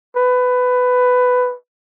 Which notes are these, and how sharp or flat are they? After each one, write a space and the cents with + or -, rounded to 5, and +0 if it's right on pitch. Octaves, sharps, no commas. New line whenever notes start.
B4 +15